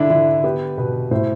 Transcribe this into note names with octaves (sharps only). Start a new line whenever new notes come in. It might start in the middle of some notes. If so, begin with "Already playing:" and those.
Already playing: D3 D4 E4
D3 E4
B3 G4
B2 B4
A2 C5